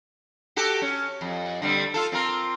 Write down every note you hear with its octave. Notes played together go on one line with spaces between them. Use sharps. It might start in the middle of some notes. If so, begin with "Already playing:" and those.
F#4 G4 A4
C#4
F2
D3 G3 C4
F4 A4
C4 F4 A#4